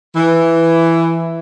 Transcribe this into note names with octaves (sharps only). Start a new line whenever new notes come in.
E3